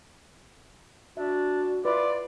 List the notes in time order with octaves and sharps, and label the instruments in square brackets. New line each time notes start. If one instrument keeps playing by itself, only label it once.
[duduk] D4 [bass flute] F#4 [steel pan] E5
[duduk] F4 [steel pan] B4 [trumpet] D5 [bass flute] E5